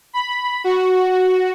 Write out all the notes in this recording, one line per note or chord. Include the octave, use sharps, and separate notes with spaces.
B5
F#4